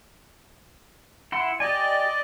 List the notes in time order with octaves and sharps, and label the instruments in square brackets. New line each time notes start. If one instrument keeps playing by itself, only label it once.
[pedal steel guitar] E4 F#5 C6
[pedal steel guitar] G4 G#5 [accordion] D5 D#5